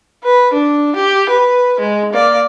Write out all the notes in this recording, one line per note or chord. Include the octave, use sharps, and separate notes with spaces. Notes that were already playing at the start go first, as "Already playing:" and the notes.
B4
D4
G4
B4
G#3
A#3 D5